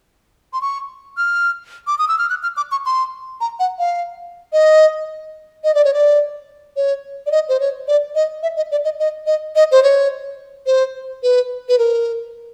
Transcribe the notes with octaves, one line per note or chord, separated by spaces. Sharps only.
C6
C#6
F6
D6
D#6
E6
F6
F#6
F6
D6
C#6
C6
A#5
F#5
F5
D#5
D#5
D5
C#5
D5
C#5
D5
D#5
C5
C#5
D5
D#5
E5
D#5
D5
D#5
D#5
D#5
D#5
C5
C#5
C5
B4
B4
A#4